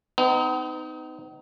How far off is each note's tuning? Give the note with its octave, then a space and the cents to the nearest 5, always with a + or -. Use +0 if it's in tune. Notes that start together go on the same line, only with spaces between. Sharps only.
B3 +45 D#4 +0